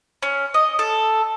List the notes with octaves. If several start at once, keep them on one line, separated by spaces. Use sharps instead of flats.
C#4
D#5
A4